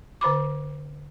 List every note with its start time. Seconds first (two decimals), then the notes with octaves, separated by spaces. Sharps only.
0.21 D3 C5 B5 D6